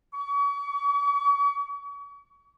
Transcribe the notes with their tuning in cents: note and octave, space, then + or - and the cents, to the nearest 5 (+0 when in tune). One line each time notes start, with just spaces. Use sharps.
C#6 +40